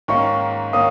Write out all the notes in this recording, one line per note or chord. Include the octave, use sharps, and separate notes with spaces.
G#2 D#3 A#3 C#4 C#6
D#3 A#3 C#4 D#6